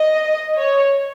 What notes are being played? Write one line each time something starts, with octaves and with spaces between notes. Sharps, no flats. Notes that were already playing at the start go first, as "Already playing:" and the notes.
Already playing: D#5
C#5